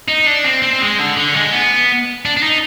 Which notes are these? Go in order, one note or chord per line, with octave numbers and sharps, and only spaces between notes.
D#4
D4
C4
C4
G#3
D3
D3
G#3
B3
D4
D4
D#4